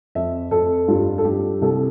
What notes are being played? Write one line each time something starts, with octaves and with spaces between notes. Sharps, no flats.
F2 E5
F2 A4
G2 F4
A4
G2 G4
C2 A4